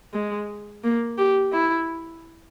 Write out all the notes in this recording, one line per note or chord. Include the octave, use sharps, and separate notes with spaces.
G#3
A#3
G4
E4